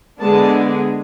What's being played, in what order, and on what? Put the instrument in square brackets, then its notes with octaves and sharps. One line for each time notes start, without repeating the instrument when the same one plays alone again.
[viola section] D3 G#3 B3 D4 A5